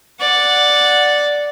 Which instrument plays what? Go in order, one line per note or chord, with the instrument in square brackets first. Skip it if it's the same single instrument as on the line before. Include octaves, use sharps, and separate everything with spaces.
[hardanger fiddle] D5 F#5